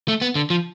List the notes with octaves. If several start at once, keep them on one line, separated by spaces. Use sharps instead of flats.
A3
B3
D3
F3